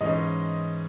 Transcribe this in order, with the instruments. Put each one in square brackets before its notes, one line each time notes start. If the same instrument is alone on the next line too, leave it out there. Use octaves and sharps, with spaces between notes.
[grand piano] G#2 E3 G#3 C#4 [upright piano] D#5